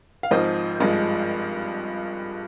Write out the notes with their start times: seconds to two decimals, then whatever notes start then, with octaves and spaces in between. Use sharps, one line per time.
0.23 F5
0.31 G#1 G#2 F3 C5 D#5
0.80 G#1 G2 F3 G#3